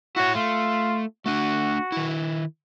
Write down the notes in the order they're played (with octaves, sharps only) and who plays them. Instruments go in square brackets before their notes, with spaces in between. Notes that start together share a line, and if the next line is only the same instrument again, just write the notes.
[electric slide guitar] E4 C#5 [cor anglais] F#4
[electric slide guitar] A3 [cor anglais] F4
[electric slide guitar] A3 D4 [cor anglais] F#4
[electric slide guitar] D#3 E4